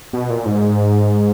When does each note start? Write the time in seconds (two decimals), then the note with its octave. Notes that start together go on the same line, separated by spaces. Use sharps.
0.13 B2
0.30 A#2
0.46 G#2